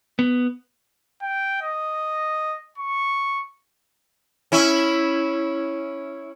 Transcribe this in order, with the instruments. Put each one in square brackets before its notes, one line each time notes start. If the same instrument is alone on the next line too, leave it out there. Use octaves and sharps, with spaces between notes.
[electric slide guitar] B3
[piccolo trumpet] G5
D#5
C#6
[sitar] C#4 E4